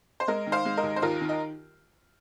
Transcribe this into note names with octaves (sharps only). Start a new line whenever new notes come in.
C5
G#3 A#4 D#5
D#3
C5 F5
G#3
A#4 D#5
D#2
C5
D#2 F4 A#4
D#3
D#5